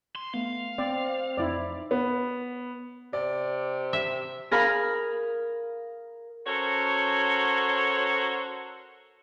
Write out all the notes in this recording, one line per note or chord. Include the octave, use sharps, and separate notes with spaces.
C6
A3 B3 F5
C4 C5 D5 C6
F2 D#4 E4 D5
B3
C3 D5
E5
G#4 A#4 F5 B5
C#4 F#4 A4 A#4 C5 C#5